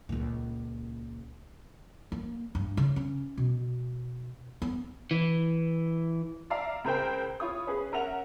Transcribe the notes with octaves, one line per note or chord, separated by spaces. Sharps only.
C#2 A#2
A#3
G2
C#3
C#4
B2
B3
E3
D5 E5 F5 A#5
C#2 A#4 C5 G5
E4 F4 C#5 D#6
C#4 G#4 B4
C#4 A#4 E5 F#5 F7